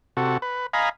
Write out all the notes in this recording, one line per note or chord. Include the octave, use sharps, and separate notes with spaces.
C3 F#4 A4
B4
D#5 F5 G#5 A#5 B5